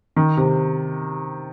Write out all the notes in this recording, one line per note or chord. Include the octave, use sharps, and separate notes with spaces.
D#3
C3